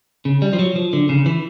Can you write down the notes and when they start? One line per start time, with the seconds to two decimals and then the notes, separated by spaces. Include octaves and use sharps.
0.25 C#3
0.42 G3
0.53 F3
0.59 F#3
0.76 F3
0.93 D3
1.09 C#3
1.26 E3